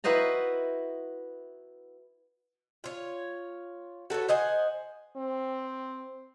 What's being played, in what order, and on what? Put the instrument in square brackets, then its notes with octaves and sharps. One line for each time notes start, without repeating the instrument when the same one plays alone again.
[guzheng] E4 F#4 B4 C5 D#5 A#5
[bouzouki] F4 C#5
F#4 A4 B4 C#5
C5 D#5 F#5 G#5
[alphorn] C4